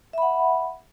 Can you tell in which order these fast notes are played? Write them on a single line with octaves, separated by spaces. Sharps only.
E5 B5 F#5